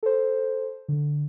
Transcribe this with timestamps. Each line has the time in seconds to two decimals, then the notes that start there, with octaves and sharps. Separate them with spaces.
0.03 A4 C5
0.88 D3